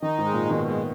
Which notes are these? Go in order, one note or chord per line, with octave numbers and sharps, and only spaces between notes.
D#3 D#4
G#2
G#3
A#2
B2 D#3
G#3